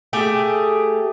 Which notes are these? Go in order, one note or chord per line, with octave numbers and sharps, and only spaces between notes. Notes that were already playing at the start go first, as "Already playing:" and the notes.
A3 G4 G#4